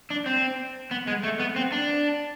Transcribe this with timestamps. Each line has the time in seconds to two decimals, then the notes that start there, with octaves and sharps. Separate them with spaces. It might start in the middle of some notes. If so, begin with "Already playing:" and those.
0.10 D4
0.26 C4
0.91 B3
1.07 G#3
1.23 A3
1.40 B3
1.56 C4
1.72 D4